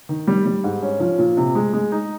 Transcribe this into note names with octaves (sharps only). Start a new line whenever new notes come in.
D#3
G3
G3
G#2
C#4
F3
A#2
C3
G#3
G#3
D#4